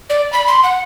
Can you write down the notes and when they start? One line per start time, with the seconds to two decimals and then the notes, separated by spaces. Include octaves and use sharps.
0.10 D5
0.33 B5
0.47 C6
0.63 F#5